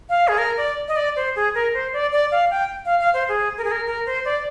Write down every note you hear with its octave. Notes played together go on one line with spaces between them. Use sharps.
F5
G#4
A#4
D5
D#5
D5
C5
G#4
A#4
C5
D5
D5
F5
G5
F5
F5
C5
G#4
A#4
G#4
A#4
A#4
C5
D5